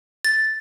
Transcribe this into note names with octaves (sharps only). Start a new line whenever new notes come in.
A6